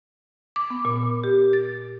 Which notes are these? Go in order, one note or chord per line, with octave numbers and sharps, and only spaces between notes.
D6
B3
A#2
G4
A6